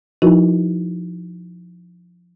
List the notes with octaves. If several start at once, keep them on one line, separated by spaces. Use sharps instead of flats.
F3 D#4 E4 F#4 A#4 B4